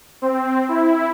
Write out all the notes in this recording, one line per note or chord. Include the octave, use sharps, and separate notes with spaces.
C4
E4